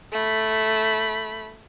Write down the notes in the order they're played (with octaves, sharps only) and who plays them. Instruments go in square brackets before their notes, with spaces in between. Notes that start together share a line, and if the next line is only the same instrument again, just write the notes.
[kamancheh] A3 B5